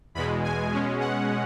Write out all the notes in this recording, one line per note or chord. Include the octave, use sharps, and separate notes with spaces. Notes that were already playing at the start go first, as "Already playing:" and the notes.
E2 B2 G#3 B5
G#5
B2 G#3 C#4
F#5